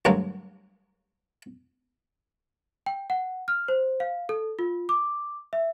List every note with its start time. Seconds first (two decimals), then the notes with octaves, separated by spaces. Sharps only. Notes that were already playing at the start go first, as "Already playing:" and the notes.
0.05 D2 G2 F#3 G#3 A#3
2.86 G5
3.10 F#5
3.48 F6
3.68 C5
4.00 F5
4.29 A4
4.59 F4
4.89 D6
5.53 E5